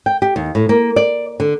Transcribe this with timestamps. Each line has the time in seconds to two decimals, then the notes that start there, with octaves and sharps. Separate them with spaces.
0.06 G5
0.22 G4
0.36 D#2
0.55 A2
0.69 A#3
0.96 D5
1.40 D3